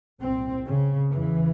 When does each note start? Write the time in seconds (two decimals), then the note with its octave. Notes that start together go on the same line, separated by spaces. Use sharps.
0.21 C2 A#2 C4
0.66 C#3
1.11 E2 C#3 E3